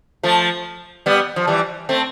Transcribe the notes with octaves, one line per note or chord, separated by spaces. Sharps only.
F3 A3
G3 B3
F3
E3 G3
A3 C4